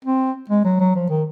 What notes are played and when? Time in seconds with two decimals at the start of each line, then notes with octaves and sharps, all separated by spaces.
0.05 C4
0.49 G#3
0.64 F#3
0.80 F#3
0.95 F3
1.09 D#3